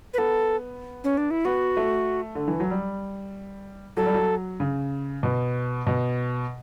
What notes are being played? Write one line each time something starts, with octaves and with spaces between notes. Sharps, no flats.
B4
B3 A4
C#4
D4
E4
B3 F#4
A3
D3
E3
F#3
G3
F#3 A4
G3
F#3
C#3
B2
B2